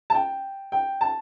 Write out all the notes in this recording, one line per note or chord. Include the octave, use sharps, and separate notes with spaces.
A5
G5
G5
A5